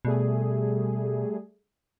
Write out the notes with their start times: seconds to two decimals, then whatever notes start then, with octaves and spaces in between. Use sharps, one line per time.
0.05 B2 G3 A3 G#4